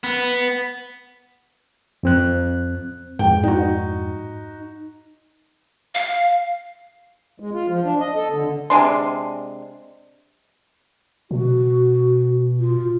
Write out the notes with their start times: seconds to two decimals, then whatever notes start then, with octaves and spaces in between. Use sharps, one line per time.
0.04 B3
2.03 F2 C4 F#6
3.19 F2 G#2 G5
3.43 D#4 F#4
5.95 F5
7.40 G#3
7.53 F4
7.67 F3
7.84 D4
8.00 D#5
8.15 A4
8.30 D3
8.70 C3 G#3 D4 C6
11.31 B2 F#4
12.60 F4